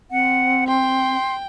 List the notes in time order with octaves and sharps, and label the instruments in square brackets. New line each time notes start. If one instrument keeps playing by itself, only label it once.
[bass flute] C4 [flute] F#5
[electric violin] G5 [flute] C6